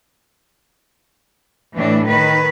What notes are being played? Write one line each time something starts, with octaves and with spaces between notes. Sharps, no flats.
A2 E3 D4
D#3 B4